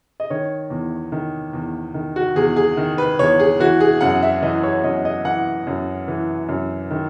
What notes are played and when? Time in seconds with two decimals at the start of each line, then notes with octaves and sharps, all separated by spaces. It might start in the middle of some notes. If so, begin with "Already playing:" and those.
0.20 D#5
0.30 D#3 C#5
0.70 E2
1.12 D#3
1.53 E2
1.94 D#3
2.16 F#4
2.36 E2 G#4
2.56 G#4
2.77 D#3
2.98 B4
3.19 E2 C#5
3.40 G#4
3.60 E3 F#4
3.80 G#4
4.01 F#2 F#5
4.23 E5
4.42 E3 D#5
4.63 C#5
4.84 F#2 D#5
5.05 D#5
5.25 E3 F#5
5.67 F#2
6.08 E3
6.49 F#2
6.91 D#3